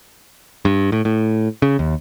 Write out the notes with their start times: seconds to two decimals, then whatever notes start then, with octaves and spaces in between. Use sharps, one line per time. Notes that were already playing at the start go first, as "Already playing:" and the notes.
0.65 G2
0.92 A2
1.05 A2
1.62 C#3
1.79 D#2